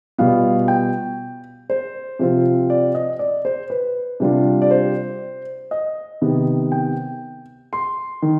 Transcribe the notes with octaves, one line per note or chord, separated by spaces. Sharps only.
B2 G3 B3 F4 F5
G5
C5
C3 F3 C4 F4
D5
D#5
D5
C5
B4
C3 G3 D4 F4
D5
C5
D#5
C3 D#3 B3
G5
C6
D#3